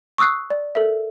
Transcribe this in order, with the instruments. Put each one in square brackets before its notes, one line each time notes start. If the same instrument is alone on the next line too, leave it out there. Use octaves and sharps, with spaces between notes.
[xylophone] C#6 D#6 E6 F#6 C7
D5
A4 A#4 E5